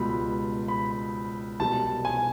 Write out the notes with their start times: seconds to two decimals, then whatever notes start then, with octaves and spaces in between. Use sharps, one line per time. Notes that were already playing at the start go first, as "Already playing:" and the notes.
Already playing: C#2 B2 G3 B5
0.68 B5
1.60 C2 B2 G3 A5
2.05 G#5